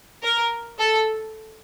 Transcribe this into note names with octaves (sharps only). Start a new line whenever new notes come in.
A#4
A4